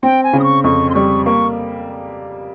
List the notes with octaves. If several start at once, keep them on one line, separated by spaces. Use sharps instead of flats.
C4 G5
G#5
C#3
D#6
C#6
F2 C#6
C6
G3 C#6
A#3 C#6